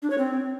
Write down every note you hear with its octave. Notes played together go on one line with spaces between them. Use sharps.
D4
C#5
C4